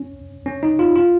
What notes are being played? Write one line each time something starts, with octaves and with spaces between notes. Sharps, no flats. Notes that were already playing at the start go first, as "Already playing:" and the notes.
Already playing: C#4
C#4
D#4
F4
F4